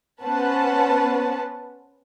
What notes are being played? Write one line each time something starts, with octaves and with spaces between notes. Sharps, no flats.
B3 C#4 B4 C5 F#5 A5